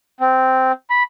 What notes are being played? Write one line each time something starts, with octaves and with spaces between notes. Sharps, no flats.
C4
B5